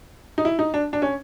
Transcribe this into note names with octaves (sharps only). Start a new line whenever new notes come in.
D#4
E4
D#4
D4
D4
C#4